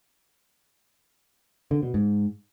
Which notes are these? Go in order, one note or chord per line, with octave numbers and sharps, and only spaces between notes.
D3
B2
G#2